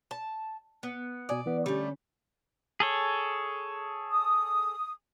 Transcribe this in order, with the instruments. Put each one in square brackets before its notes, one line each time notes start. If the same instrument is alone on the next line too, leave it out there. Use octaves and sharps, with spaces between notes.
[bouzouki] A5
B3
[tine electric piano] B2 G#5 D#6 [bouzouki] D5
[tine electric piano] E3 B3
[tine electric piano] D3 C#4 [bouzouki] G3 A3
[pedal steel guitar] G#4 A4 C#5
[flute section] D#6